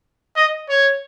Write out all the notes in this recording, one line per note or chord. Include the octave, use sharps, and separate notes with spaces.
D#5
C#5